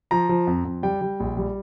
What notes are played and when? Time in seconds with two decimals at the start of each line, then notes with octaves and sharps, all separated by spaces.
0.11 F3 A#5
0.29 F3
0.47 F2
0.65 F2
0.83 G3 G5
1.02 G3
1.20 A#1
1.37 G3